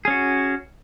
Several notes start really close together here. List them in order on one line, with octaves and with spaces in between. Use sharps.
G#4 C#4 F#4